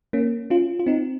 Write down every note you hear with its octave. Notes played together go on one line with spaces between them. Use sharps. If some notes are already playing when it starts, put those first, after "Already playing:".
A#3 C#4
C#4 F4
F4
C4 D#4